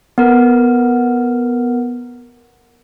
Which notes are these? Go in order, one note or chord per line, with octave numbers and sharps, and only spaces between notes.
B3 A#4